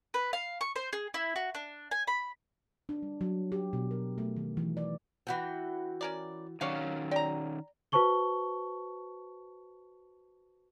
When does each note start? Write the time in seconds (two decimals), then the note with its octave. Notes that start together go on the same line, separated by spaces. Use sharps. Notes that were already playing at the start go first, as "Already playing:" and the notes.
0.14 B4
0.33 F5
0.61 C#6
0.76 C5
0.93 G#4
1.14 E4
1.36 F#4
1.55 D4
1.91 G#5
2.07 B5
2.89 D4
3.02 G3
3.21 F#3
3.52 G4
3.73 B2
3.91 A#4
4.18 A3
4.36 D#3
4.57 E3
4.77 D5
5.27 E3 F#4 G5
6.01 C#4 A#4 D5
6.61 D#3 F#3 C#4 C#5 D5 F5
7.12 D5 G5 A#5
7.92 F#4 B4 C5 A5 C#6 G7